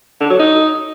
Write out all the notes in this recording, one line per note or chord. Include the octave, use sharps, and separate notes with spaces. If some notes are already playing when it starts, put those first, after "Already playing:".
D3
F#3
D#4